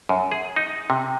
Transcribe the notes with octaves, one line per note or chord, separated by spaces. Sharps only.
F#2
G#4
D#4
C3